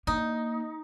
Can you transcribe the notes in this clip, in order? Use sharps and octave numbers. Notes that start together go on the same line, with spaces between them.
A#3 D#4